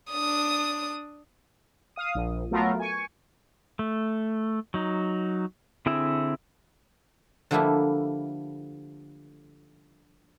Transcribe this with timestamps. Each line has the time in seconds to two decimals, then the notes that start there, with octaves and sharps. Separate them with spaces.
0.11 D4 D#6
1.96 F5 D#6
2.15 A#1
2.51 F#3 A3 B3 F4 A#4
2.80 G#5 C#6
3.79 A3
4.74 F#3 D#4
5.86 D3 C4 E4 G#4 E5
7.51 D3 F3 G3 A3 A#3 E4